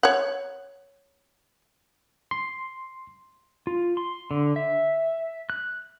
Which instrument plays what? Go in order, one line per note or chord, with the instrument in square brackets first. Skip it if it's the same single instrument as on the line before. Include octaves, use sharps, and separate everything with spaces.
[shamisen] C#5 F#5
[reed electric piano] C6
[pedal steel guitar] F4
C6
D3
E5
F#6